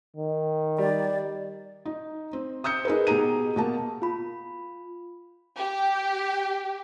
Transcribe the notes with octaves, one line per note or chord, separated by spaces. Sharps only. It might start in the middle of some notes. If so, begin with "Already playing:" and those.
D#3
G3 D5
D#4
C4
D#6 E6 G6 C#7
D#4 G#4 A#4 B4
B2 G4 G#4 A#5 D#7
B2 A#3 A5
F4 B5
G4